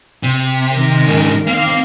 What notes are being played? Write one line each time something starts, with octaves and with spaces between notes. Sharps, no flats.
C3
D#3 A#4
G#2 C#3
D#3 A#3 C4 F5